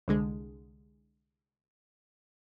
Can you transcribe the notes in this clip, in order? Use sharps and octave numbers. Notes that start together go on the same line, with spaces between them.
C2 D3 G#3